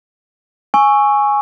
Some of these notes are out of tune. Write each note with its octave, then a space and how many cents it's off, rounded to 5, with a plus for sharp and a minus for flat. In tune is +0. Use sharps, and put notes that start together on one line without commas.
G#5 +0 C#6 +0 E6 +0